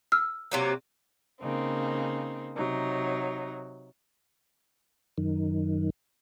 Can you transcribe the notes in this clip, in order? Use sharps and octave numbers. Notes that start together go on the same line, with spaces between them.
E6 F6
C3 F#3 A#3
C#3 A#3 C4 D#4
C3 F#3 D#4
F#2 D#3